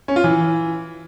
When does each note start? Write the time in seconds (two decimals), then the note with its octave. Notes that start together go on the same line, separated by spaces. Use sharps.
0.08 C#4
0.16 F4
0.24 E3